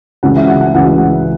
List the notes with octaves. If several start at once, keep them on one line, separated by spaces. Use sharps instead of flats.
C#2 C#3 E3 C#4 F#5
E5
F#5
F#5
C#2 C#3 E3 C#4 F#5